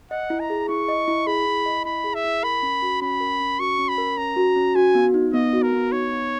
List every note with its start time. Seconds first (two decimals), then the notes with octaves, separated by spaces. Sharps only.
0.11 D#5 F#5
0.30 E4
0.40 A#5
0.50 G#4
0.69 E4 C#6
0.89 D#5
1.08 E4
1.27 G#4 B5
1.46 E4
1.66 D#5
1.85 E4 B5
2.04 G#4
2.15 E5
2.24 E4
2.43 A#4 B5
2.63 C#4
2.82 F#4
3.01 C#4 B5
3.20 A#4
3.40 C#4
3.59 F#4 C#6
3.79 C#4
3.89 B5
3.98 A#4
4.17 C#4 A#5
4.37 F#4
4.56 C#4
4.75 F#4 G#5
4.95 B3
5.14 D#4
5.33 B3 D#5
5.53 F#4
5.63 A#4
5.73 B3
5.92 D#4 C#5
6.11 B3